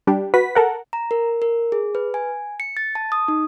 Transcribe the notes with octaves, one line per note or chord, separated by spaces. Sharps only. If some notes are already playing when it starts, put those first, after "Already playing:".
G3 D4 G4
F#4 B4 B6
A4 A#4 F#5
A#5
A#4
A#4
G#4
B4
G#5
C#7
A6
A5
D#6
D#4